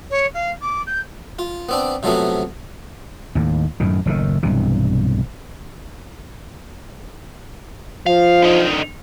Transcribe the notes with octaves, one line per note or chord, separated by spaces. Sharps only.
C#5
F5
D6
G6
F4
B3 C4 D4
C3 F3 F#3 A3 B3
D#2 A2
F#2 A2 D#3
F#1 A2 C3 D#3
B1 G2 C3 E3
F3 F5
D3 D#4